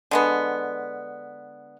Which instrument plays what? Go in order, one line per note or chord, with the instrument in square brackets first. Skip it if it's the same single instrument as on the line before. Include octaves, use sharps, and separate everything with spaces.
[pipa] D3 G#3 B3